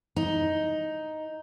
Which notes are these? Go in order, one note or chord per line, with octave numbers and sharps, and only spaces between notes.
D#4